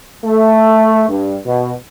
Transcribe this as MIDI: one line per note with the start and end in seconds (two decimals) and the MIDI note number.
0.25 1.05 57
1.09 1.37 43
1.46 1.73 47